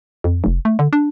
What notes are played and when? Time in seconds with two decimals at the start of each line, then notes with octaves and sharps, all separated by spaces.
0.24 F2
0.44 F1
0.65 A3
0.79 D3
0.93 D4